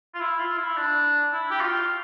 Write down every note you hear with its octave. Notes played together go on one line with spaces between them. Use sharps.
F4
E4
F4
E4
D4
E4
G4
F4